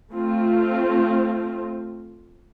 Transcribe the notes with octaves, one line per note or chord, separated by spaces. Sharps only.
A3 C4 F4